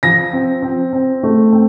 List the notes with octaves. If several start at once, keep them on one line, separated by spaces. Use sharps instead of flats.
F3 A#6
C4
C4
C4
A3
C4